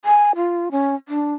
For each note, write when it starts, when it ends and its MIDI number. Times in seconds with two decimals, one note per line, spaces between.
0.05 0.32 80
0.36 0.69 65
0.72 0.95 61
1.09 1.34 62